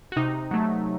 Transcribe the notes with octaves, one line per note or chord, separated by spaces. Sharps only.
F#4
C3 D#4
F#3 A3